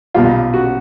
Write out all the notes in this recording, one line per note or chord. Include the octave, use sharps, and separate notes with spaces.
B1 A#2 G3 F4
F#4